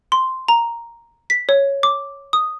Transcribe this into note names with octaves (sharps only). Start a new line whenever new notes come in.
C6
A#5
B6
C#5
D6
D#6